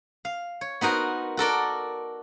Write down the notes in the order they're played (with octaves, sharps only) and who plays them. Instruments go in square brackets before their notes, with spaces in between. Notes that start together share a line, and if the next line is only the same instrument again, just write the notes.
[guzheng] F5
C#5
B3 D#4 F#4 A#4 C5
F#4 A4 A#4 D5